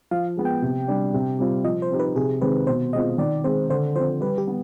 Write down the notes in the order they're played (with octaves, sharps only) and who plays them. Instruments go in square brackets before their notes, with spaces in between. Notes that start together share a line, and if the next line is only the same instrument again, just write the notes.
[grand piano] F3 [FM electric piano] F5
[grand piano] G#3 B3
[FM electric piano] G5
[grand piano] C3
G3 D4 G4
C3
G3 C4 F4
[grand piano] F3 [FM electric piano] D#5
[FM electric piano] C5
[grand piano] C4 D#4 G4
[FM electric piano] B4
[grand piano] C3 [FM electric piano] G#4
[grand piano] D#3 G#3 C4 [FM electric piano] B4
[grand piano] B2 [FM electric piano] C5
[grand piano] G#3 C4 F4 [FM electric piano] D#5
[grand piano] D#3 [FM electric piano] D5
[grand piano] G#3 C4 [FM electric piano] C5
[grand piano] D3 [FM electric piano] C5
[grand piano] F3 C4 [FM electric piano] C5
[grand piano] G3 [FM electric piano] B4
[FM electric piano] G4
[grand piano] B3